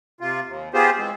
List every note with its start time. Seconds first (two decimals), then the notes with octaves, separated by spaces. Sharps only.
0.21 C3 F4
0.46 D#2
0.74 B3 F4 G4 G#4 C5
0.98 E3 G#3 C4